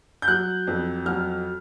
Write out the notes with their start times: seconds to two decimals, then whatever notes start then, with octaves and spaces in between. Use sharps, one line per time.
0.22 G6
0.28 F#3 F#6
0.67 F2
1.06 F#3 F6